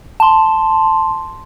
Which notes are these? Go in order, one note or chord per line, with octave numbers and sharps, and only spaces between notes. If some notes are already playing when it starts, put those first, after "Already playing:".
A5 C6